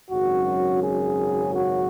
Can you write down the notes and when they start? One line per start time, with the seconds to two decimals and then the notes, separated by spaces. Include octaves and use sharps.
0.10 G#1 F#2 C#3 F#3 F#4
0.82 G#4
1.55 F#4